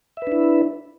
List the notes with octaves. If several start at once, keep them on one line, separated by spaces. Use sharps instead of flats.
D4 E4 B4 E5